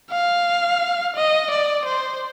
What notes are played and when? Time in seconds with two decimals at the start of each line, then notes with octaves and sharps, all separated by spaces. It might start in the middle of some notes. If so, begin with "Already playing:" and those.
0.11 F5
1.16 D#5
1.51 D5
1.85 C5